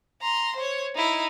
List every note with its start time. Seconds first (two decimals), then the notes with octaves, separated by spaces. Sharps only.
0.21 A#5 C6
0.56 C5 C#5
0.95 D#4 E4